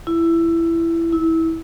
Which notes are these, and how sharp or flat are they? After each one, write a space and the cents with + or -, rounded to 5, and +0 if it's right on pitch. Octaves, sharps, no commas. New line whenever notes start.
E4 +15
E4 -20